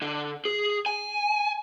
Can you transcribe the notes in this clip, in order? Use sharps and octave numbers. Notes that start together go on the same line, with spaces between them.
D3
G#4
G#5